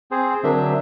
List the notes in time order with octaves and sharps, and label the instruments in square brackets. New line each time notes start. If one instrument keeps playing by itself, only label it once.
[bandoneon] C4 G#4 C5
[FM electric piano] D3 C4 A#4 [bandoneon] F#3 D4 E5